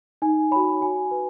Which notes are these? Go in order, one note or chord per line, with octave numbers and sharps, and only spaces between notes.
D#4 G#5
F#4 C#5 B5
F#4 G#5
B4